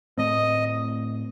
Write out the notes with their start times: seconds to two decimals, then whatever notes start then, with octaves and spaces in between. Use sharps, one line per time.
0.18 A2 A3 C4 D#5